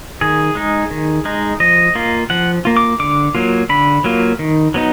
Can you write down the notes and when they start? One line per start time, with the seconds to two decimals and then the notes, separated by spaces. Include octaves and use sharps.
0.21 D#3 G#4
0.55 G#3 D#4
0.91 D#3
1.25 G#3 D#4
1.60 F3 D#5
1.95 A#3 F4
2.30 F3 F#5
2.65 A#3 F4
2.77 D6
2.99 D3 D6
3.35 F#3 A#3 F4
3.69 D3 B5
4.04 F#3 A#3 F4
4.39 D#3
4.74 F#3 B3 D#4